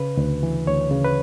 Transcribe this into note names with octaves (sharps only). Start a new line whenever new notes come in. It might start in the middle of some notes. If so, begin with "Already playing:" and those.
Already playing: C#3 B4
D2
E3
D2 C#5
C#3
B4